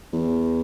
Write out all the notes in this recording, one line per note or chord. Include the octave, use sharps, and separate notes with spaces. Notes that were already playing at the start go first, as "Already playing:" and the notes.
E2